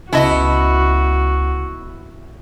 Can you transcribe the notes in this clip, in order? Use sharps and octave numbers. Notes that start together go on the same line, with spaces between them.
C#2 B3 E4 F#4 D#5 A5